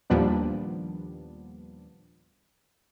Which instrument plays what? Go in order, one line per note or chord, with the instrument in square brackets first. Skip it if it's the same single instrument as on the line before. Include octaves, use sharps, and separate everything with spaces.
[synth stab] D#2 A#2 F3 G3 B3 D4